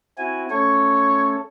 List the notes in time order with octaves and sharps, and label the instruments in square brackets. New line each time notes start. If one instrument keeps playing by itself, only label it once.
[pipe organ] C4 E4 F#4 [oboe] G#5
[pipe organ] A3 C#4 A4 [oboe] C#5